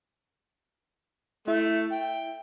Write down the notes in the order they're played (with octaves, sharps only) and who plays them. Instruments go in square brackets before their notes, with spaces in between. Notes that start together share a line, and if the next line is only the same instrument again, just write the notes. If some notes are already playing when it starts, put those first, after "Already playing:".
[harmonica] A3 [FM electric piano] E4 E5
[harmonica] G5